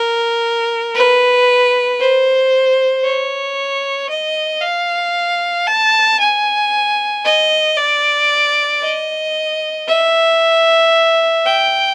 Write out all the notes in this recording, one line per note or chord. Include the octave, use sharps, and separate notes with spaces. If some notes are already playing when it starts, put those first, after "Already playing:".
Already playing: A#4
B4
C5
C#5
D#5
F5
A5
G#5
D#5
D5
D#5
E5
G5